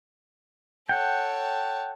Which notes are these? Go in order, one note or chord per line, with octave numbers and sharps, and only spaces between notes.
A4 C#5 F#5 G5